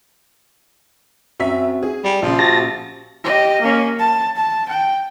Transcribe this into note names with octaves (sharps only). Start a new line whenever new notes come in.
F#2 C4 F#4 E5 B6
G#4
G3 D5
A#1 C#3 F3
F#4 G4 A5 A#6
G4 D#5
A#3 C#4
A5
A5
G5